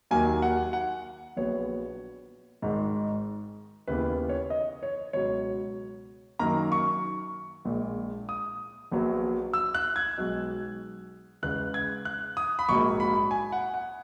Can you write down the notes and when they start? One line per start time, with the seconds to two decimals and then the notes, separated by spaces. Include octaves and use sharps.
0.11 D#2 D#3 F#3 A#3 G#5
0.42 F#5
0.73 F#5
1.36 A#1 A#2 F#3 B3 C#5
2.62 G#1 G#2 D#3 G#3
3.87 D#2 C#3 E3 B3 B4
4.29 C#5
4.50 D#5
4.83 C#5
5.13 C#2 B2 F#3 C#5
6.39 F#2 D#3 A#3 A#5
6.72 C#6
7.65 A#1 A#2 G#3
8.29 D#6
8.92 A#1 A#2 F#3 B3
9.53 E6
9.74 F#6
9.96 G#6
10.18 B1 B2 G#3
11.42 E2 C#3 G#3 B3 F#6
11.74 G#6
12.05 F#6
12.37 D#6
12.59 B5
12.69 A#1 G#2 F#3 A#3 C#6
13.00 B5
13.31 G#5
13.52 F#5
13.74 F#5